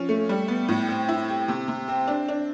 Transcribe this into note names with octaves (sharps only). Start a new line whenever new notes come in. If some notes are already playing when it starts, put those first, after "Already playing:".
Already playing: F3 C#4
A3
G3
B3
A2
C4
E4
G4
C3
C3
C4
D4
D4